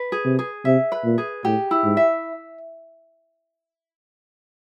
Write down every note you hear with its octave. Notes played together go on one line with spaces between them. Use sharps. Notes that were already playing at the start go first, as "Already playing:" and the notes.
Already playing: B4
G#4
C3
G#4
C3 E5
B4
A#2
G#4
A2 G4
E4
G#2
E5